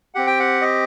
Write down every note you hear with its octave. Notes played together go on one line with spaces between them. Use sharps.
C4 G4 F#5
G5
F#5
D#5